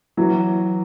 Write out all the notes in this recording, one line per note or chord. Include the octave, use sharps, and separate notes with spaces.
E3 F#3